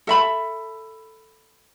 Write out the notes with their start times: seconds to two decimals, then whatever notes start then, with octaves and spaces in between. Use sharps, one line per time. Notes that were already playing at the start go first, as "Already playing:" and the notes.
0.07 A4 E5 B5